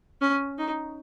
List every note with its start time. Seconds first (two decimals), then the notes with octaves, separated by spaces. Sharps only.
0.21 C#4
0.58 D#4